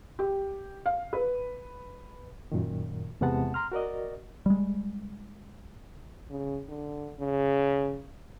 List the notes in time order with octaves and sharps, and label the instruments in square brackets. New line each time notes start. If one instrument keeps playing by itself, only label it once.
[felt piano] G4
F5
B4
[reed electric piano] F#2 A#2 D#3
E2 C3 G#3 B3 F#5 A5
A#5 C6 F6
F#4 A#4 D5 D#5
[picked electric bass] G3 G#3
[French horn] C#3
D3
C#3